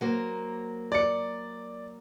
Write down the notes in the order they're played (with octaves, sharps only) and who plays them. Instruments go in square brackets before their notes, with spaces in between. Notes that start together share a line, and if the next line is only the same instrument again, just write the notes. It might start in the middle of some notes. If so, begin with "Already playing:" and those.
[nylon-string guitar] F#3 A#3 C5
[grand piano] D5 C#7